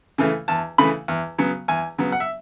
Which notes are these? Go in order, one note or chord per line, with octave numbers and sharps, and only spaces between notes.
C#3 E3 A3
E2 A5
C#3 E3 A3 B5
E2
C#3 F#3 B3
E2 G#5
C#3 F#3 B3
F#5
E5